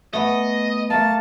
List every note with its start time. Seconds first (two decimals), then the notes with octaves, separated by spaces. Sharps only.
0.13 A3 B3 D#5
0.90 A3 A#3 A5